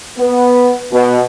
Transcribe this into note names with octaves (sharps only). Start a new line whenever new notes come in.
B3
B2